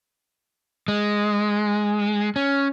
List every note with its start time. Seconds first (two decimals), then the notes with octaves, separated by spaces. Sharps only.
0.88 G#3
2.36 C#4